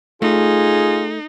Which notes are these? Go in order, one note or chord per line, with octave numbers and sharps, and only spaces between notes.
A3 D#4 F4 G#4